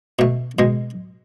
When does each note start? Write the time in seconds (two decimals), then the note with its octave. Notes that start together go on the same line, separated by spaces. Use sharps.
0.19 B2 A3
0.59 B2 G#3